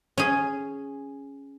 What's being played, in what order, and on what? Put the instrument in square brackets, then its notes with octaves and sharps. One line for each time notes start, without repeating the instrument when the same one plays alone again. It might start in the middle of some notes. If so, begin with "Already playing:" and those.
[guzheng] C#4 G#4